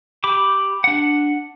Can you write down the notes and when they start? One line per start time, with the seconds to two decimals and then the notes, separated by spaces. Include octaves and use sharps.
0.24 G4 B5 D6
0.84 D4 F#5